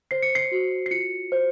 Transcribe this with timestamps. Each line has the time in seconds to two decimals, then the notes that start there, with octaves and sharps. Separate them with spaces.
0.11 C5 C7
0.23 C#7
0.35 C7
0.52 F#4
0.86 C7
0.91 F4 C#7
1.32 C5